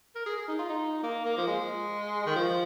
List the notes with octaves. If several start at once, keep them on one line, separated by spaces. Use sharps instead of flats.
A#4
G#4
G#4
D#4
F4
D#4
A#3
A#3
F3
G#3
D#3
F3